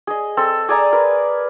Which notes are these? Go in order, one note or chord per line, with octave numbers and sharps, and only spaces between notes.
G#4 D#5
C4 A4
G#4 D5 G#5 A#5
A#4 B4